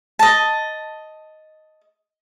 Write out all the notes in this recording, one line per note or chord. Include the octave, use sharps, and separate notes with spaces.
D#5 A5